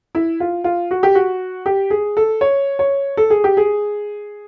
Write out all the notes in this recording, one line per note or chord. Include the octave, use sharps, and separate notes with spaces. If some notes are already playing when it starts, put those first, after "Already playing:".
E4
F4
F4
F#4
G4
F#4
G4
G#4
A4
C#5
C#5
A4
G#4
G4
G#4